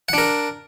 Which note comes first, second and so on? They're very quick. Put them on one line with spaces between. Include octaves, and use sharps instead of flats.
F#5 D4 A#4